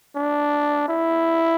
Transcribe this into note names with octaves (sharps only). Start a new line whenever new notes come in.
D4
E4